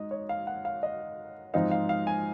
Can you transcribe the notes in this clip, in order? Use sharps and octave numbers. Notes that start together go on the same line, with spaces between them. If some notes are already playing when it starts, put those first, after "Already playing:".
Already playing: G#2 D#5
C#5
F5
F#5
F5
D#5
G#2 F3 C4 D#4 F5
F5
F5
G#5